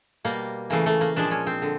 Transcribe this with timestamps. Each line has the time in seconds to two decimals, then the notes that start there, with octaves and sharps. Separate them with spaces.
0.25 B2 G3 A#3
0.70 C#3 E3 A3 A#3
0.86 A3
1.01 A#3
1.16 A#2 F3 G#3 D4
1.31 C#4
1.47 C4
1.62 D3